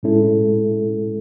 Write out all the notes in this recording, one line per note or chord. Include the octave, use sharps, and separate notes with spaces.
A2 G#3 C#4 E4 A4